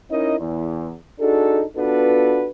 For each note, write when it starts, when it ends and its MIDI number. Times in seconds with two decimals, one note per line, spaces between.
0.10 0.36 61
0.10 0.36 63
0.10 0.36 64
0.10 0.36 70
0.10 0.36 75
0.39 0.93 40
1.20 1.63 62
1.20 1.63 63
1.20 1.63 66
1.20 1.63 68
1.20 1.63 69
1.77 2.48 59
1.77 2.48 62
1.77 2.48 65
1.77 2.48 66
1.77 2.48 69
1.77 2.48 71